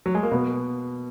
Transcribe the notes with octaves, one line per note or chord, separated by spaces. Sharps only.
F#3
G#3
A#3
B2 B3